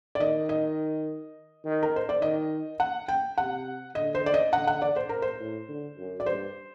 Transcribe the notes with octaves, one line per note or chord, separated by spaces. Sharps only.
D5
D#3 D#5
D#5
D#3
A#4
C5
D5
D#3 D#5
F#5
G5
C3 F#5
D3 D#5
C5
D5
D#5
D3 F#5
F#5
D5
C5
A#4
C5
A2
D3
F#2
D5
G2 C5